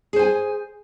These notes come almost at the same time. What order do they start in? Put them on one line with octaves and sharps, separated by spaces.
G#4 C5 G#5